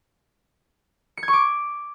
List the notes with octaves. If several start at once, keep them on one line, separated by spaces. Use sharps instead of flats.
C#7
G#6
C#6
D6